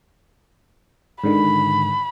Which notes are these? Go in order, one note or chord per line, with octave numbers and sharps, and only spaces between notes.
G#2 D3 D#3 B5